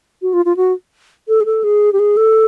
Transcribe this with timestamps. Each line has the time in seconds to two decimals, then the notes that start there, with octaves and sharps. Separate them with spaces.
0.22 F#4
0.33 F4
0.45 F4
0.57 F#4
1.28 A4
1.41 G#4
1.45 A4
1.64 G#4
1.93 G4
1.99 G#4
2.17 A4